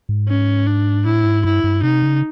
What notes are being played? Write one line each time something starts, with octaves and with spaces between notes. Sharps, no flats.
G#2
C#4
D4
A2 E4
G#2
G2 E4
G2
C3 D#4
C#3